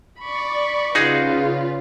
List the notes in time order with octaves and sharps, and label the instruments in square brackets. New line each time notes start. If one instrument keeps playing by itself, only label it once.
[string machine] D5 [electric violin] B5 C#6
[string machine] C#3 [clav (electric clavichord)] D#4 F#4 G#4 [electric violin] F4 B4